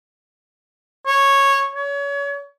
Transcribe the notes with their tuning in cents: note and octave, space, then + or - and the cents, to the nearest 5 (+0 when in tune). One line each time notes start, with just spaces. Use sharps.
C#5 -10
C#5 +35